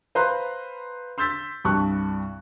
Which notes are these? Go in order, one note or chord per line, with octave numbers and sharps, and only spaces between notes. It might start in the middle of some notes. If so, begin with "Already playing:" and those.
B4 C5 F5 A#5 C6 F#6
C6 E6 G6 A6 B6
C2 G2 A5 C#6 F#6